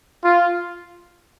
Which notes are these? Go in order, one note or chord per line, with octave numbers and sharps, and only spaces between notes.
F4